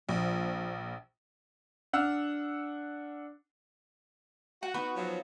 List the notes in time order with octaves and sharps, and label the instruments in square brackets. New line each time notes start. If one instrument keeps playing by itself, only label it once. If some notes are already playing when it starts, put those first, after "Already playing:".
[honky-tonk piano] A#1 [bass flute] F3
[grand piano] D4 F#5 E6 F6
[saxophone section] F#4 [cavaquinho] F#5
[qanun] B3 D#4 [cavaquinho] B4 C#6
[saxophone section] F3 F#3